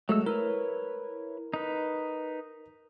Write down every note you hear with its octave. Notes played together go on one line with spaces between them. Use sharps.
F#3 G#3 A3 A4 E6
E4 A#4 B4 C#5
D#4 B4